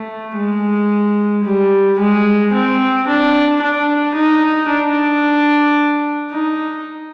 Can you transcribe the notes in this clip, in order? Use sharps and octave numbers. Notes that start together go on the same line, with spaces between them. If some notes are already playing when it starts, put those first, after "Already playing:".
Already playing: A3
G#3
G3
G#3
C4
D4
D4
D#4
D4
D#4